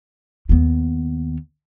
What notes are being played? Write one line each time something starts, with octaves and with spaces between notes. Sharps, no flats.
D#2 B3